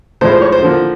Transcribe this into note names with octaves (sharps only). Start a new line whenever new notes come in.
A2 F3 G#3 C5
C5
C#5
C5
D3 F3 A#3